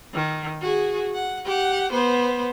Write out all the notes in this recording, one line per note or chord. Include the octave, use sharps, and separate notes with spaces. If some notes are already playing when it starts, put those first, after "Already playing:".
D#3
F#4 G#4
F#5
G4 F#5
B3 C5